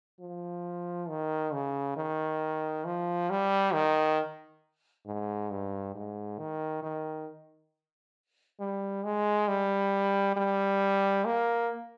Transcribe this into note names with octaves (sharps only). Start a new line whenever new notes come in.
F3
D#3
C#3
D#3
F3
G3
D#3
G#2
G2
G#2
D#3
D#3
G3
G#3
G3
G3
A#3